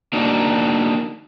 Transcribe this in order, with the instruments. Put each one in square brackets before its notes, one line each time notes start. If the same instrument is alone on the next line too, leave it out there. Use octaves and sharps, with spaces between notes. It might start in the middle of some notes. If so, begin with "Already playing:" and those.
[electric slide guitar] A#3 D4 D#4 F#4